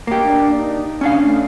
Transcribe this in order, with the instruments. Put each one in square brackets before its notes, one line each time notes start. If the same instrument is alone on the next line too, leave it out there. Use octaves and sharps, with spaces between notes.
[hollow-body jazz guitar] A#3 G4
[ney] D4
D#4
[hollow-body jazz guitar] C#4 D4 F5
[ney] A3